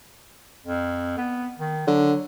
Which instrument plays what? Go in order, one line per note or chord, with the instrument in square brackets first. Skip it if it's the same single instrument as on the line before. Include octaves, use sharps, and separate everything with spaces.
[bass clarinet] F2
B3
D#3
[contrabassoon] D3 [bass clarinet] F#3